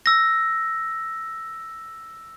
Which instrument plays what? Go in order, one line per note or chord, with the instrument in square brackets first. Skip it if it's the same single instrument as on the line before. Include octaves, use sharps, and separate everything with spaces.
[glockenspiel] E6 A#6